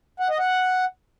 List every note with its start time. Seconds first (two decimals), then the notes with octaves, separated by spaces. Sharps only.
0.20 F#5
0.29 D#5
0.39 F#5